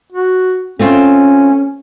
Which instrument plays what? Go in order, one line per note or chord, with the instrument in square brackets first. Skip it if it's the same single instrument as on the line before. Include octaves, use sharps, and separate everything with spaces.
[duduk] F#4
[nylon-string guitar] A3 C4 F4 [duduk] C#4